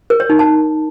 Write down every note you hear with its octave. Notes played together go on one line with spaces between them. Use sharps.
A#4
C#5
D#4
A5